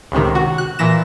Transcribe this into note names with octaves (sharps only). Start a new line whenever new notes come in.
C#2 A2 C3 D#3
F#4
F#6
A#2 E3 A#6 E7